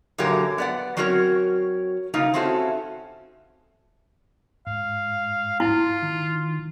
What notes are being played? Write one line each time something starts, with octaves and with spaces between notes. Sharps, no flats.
F#2 A#2 D3 F#3 G4 A#4
B3 D5 F#5
F#3 C4 C#4 F#4 A#4 C#5
C#3 G3 A#3 D#4 F4
C4 C#4 E4 F#4 G4 A4
G#2 F5
E4 F4
D#3